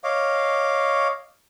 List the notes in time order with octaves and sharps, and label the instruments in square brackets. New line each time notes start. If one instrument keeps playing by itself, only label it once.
[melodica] C#5 D#5 F5 D6